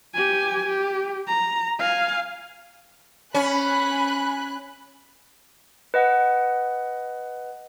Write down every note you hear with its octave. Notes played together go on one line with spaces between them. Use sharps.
G4 G#5
G4
A#5
F5 G#5
C#4 G#5 B5 F#6
B4 D#5 F#5